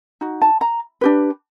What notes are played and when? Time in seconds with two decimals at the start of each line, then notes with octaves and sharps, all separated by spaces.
0.21 D#4 F#4
0.42 A5
0.61 A#5
1.01 D4 G4 B4